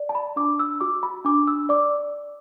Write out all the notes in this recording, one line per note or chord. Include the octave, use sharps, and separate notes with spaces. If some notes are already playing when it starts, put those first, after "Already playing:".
Already playing: D5
A5
B5
D4 D6
E6
F#4 D6
B5
D4 D6
E6
D5 D6